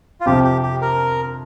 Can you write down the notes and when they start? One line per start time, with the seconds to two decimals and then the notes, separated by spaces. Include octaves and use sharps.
0.21 F4
0.26 F2 C3 F3 C4 G4
0.44 G4
0.63 G4
0.81 A#4